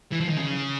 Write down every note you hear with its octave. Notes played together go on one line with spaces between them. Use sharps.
E3
F3
D#3
C#3